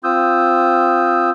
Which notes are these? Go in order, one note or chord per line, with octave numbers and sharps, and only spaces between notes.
C4 F4 D#6 E6 G6